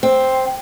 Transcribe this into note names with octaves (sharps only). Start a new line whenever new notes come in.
C4